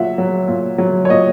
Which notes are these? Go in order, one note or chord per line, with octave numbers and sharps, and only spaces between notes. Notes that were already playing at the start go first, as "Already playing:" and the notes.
Already playing: A#2 F#3 E5 F#5
F#3
A#2
F#3
C#5
A#2 D#5